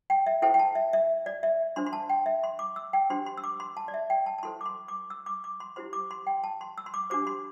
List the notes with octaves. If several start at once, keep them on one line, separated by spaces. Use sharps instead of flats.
G5
E5
E4 A4 C5 G5
G5
A5
E5
E5
D5
E5
D4 C5 C6
C6
A5
G5
E5
C6
D6
E6
G5
D4 G4 C5 C6
C6
E6
D6
C6
A5
D5
E5
G5
A5
A5
E4 A4 C5 C6
D6
C6
D6
E6
D6
D6
C6
E4 G4 C5 C6
D6
C6
G5
A5
C6
E6
C6
D6
D4 G4 C5 D6
C6